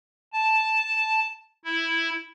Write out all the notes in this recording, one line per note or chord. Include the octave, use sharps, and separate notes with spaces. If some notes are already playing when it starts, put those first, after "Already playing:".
A5
E4